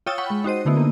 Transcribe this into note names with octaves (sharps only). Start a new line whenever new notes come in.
F4 C#5 G5 D#6 E6 A6
F#5 G5 B5 C#6 E6
G#3
D#4 F#4 C5 D#7
D3 A3 B3 D#4 E4
A#3